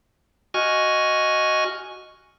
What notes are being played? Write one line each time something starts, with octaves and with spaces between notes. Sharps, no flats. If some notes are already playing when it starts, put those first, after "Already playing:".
F#4 D#5 G#5 C#6 F6